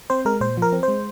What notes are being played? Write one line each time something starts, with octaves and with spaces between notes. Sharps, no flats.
C4 C5
G#3 A#4
A#2 C5
F3 A#4
C4
C5
G#3